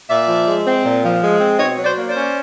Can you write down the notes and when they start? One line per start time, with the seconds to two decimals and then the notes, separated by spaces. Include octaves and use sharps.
0.10 A#2 D5 E5
0.29 F3
0.47 G#3
0.66 C4
0.84 A#2
1.03 F3
1.22 G#3
1.40 C4
1.59 B2 C#5 D#5
1.78 F#3
1.84 C5 D5
1.97 A#3
2.09 C5 D5
2.15 C#4